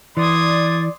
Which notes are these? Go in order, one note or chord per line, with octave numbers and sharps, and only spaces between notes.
E3 D5 C6 D#6 G#6